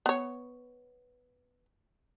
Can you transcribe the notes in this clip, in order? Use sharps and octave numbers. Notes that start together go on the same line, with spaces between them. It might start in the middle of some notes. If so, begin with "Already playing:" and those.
B3 C#5